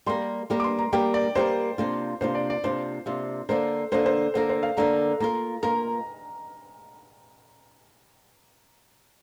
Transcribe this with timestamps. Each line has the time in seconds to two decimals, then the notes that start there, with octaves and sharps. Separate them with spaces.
0.06 G3 A#3 G4 A#4 C6
0.50 G3 A#3 G4 A#4
0.60 D6
0.64 C6
0.79 A#5
0.93 G3 A#3 G4 A#4 G5
1.14 D5
1.35 G3 A#3 G4 A#4 C5
1.78 C3 A#3 D4 F4
2.21 C3 A#3 D4 F4 C5
2.35 D5
2.50 D5
2.64 C3 A#3 D4 F4 C5
3.06 C3 A#3 D4 F4
3.49 D3 A#3 D4 A#4 C5
3.92 D3 A#3 D4 A#4 C5
4.06 C5
4.34 D3 A#3 D4 A#4 C5
4.49 C5
4.63 F5
4.77 D3 A#3 D4 A#4 A#5
5.20 A#3 F4 A#4 A#5
5.63 A#3 F4 A#4 A#5